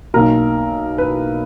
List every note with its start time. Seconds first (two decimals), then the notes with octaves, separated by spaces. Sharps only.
0.14 B1 B2 A#3 A#4
0.98 B4